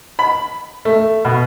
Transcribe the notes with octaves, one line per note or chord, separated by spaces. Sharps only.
B5
A3
B2